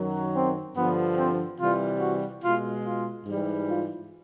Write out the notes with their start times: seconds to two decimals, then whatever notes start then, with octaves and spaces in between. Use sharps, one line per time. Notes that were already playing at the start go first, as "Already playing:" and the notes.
Already playing: F#2 D#3 F#3
0.34 C4
0.75 G2 D3 F3 B3
1.17 C4
1.59 C3 E3 G3 F4
2.00 F#4
2.43 B2 G#3 F4
2.84 F4
3.26 G#2 E3 G3
3.68 F4